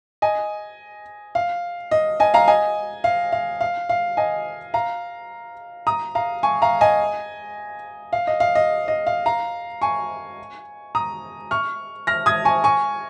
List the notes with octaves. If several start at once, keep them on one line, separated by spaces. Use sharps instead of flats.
D#5 G#5
F5
D#5
D#5 G#5
F5 A#5
D#5 G#5
F5
F5
F5
F5
D#5 G#5
F5 A#5
A#5 D#6
F5 A#5
G#5 C#6
F5 A#5
D#5 G#5
F5
D#5
F5
D#5
D#5
F5
F5 A#5
G#5 C#6
A#5 D#6
C#6 F6
F6 A#6
D#6 G#6
G#5 C#6
G#5 C#6